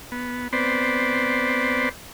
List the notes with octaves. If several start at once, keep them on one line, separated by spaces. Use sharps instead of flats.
B3
B3 C4 B4 C5 D5